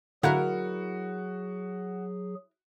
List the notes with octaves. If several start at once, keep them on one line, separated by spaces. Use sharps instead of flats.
D3 F#3 E4 F#4 G#4 A#4 F5 F#6